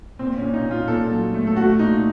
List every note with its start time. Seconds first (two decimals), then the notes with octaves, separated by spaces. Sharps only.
0.19 A#2 C4
0.36 C#4
0.42 A#2
0.54 D#4
0.65 A#2
0.71 F4
0.88 A#2 A4
1.10 F#3
1.34 A3
1.47 A4
1.56 A3 F#4
1.79 A#2 D#4